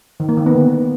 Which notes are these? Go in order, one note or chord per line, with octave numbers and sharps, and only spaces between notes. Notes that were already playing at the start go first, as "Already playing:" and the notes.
D#3
A#3
D#3
B3
D3